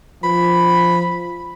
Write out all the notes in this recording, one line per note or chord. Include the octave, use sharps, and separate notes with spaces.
F3 B5